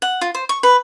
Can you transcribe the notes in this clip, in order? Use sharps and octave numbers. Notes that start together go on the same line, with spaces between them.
F#5
F4
C5
C#6
B4